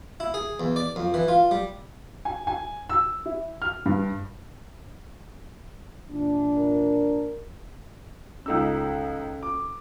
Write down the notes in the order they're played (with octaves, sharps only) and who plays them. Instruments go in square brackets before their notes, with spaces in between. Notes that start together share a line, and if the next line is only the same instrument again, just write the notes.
[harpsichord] E4
G#4
E2
D5
F2
E3
F4
G3
[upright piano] G#5
G#5
E6
E4
F6
G2
[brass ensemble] A#2 E3 D4
[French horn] A#4
[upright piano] C#2 D#4 E6 [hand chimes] C#4 A4
[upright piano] D6